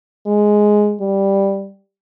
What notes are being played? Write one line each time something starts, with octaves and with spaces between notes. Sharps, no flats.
G#3
G3